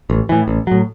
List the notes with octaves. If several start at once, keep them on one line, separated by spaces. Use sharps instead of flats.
A1
A2 E3
A1
A2 F#3